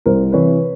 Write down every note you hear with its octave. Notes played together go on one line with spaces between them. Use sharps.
C2 A#4 C5
C3 E3 B4 C#5